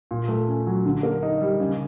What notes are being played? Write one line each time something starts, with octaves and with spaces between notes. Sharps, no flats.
A#2
A3
C#4
F#3
D3
A#3
D#4
G3
C#3